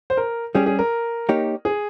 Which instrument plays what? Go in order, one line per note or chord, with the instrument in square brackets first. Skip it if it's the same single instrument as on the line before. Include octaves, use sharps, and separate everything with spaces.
[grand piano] C5
A#4
[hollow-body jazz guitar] G3 C#4 G4 [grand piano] G#4
[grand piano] G#4
A#4
[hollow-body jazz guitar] A#3 D#4 G4 C#5
[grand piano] G#4